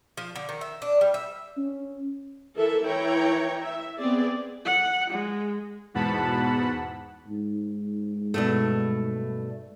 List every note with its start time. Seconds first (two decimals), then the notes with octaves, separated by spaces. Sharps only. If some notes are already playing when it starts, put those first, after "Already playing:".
0.17 F3
0.36 D3
0.49 D#3
0.61 E5
0.82 D4
1.01 G3
1.14 E5
1.57 C#4
2.56 E3 A4 A#4 E5
2.85 E3 E4 C#5 G5 A#5
3.60 E5
3.98 B3 C4 G#4 D5
4.65 F#5
5.10 G#3
5.94 E2 G#2 B2 F#5 A5 B5
7.28 G#2
8.34 G2 B2 A3